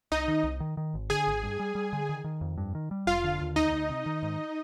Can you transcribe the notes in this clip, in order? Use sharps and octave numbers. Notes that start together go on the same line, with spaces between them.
C2 D#4 D#5
D#3
C2
D#3
D#3
G#1
D3 G#4 G#5
G#1
G2
G3
G3
D3
D#3
D#3
F2
G2
D#3
G3
F1 F4 F5
D3
D#2
D2 D#4 D#5
D2
C3
D#3
G#2